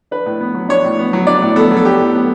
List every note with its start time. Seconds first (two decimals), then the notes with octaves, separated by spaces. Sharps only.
0.11 D4 B4
0.26 A2
0.40 B3
0.55 F#3
0.69 D4 C#5
0.84 A2
0.99 B3
1.13 F#3
1.27 D4 D5
1.42 A2
1.56 B3 A4
1.71 F#3
1.77 A4
1.85 D4 G4
2.00 A2
2.15 B3